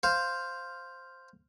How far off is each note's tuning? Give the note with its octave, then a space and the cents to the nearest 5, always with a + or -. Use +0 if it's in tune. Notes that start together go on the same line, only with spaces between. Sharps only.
C5 +0 F5 +0